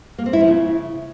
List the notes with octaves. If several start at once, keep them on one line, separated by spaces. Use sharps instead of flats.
A#3
C4
E4
F3
C#3